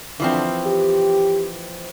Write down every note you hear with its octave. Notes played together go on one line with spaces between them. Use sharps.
D3 E3 F3 C4
G4